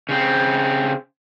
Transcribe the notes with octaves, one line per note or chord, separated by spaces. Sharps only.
C#3 C4